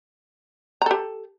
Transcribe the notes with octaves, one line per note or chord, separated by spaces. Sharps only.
G4 A4 A#5